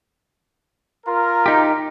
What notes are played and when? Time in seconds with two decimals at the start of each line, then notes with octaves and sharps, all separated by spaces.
1.06 F4 A#4
1.46 D#4 G4